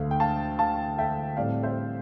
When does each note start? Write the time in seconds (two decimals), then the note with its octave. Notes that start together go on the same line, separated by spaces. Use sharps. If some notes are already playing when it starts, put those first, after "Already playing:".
Already playing: D2 D3 A3 F5
0.11 G5
0.20 F5 A5
0.59 F5 A5
0.98 E5 G5
1.37 A2 G3 C4 D5 F5
1.63 C5 E5